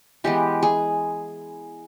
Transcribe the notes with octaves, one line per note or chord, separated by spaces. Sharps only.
E3 G#3 B3 G4
G#4